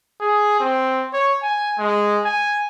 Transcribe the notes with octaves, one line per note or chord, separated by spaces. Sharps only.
G#4
C4
C#5
G#5
G#3
G#5